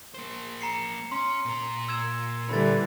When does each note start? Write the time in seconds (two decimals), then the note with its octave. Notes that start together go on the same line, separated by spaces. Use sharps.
0.14 A#3 C5
0.61 A#5 C7 C#7
1.11 C#4 C6
1.45 A#2 A#5
1.88 E6 G#6 E7
2.49 D3 E3 G3 B5 A6